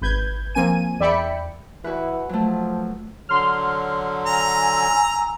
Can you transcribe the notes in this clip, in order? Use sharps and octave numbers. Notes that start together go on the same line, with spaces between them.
G#1 B4 G6 G#6
F3 A#3 C4 G#5 D#7
E2 D5 E5 G5 B5 C#7
E3 F#4 B4
F3 F#3 A3
D3 F#3 C6 F6
G#5 A#5 E6